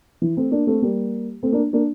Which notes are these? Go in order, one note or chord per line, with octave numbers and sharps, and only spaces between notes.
E3
A3 C4
A#3 D4
A3 C4
G3 A#3
A3 C4
A#3 D4
A#3 D4